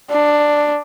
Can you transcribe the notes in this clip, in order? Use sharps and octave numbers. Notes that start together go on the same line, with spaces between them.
D4